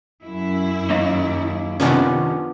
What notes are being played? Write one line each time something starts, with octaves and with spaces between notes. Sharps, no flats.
F#2 E4
A#3 D#4 D#5
C3 D#3 F3 B3 C#4 D4